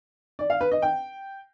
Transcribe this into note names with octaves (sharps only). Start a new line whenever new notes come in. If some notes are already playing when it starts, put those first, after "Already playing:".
D5
F5
B4
D#5
G5